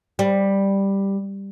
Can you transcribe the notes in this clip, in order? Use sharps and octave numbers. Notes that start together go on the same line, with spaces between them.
G3